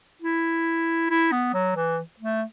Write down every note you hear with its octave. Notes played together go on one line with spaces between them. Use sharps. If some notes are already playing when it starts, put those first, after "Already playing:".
E4
E4
B3
F#3
E3
A3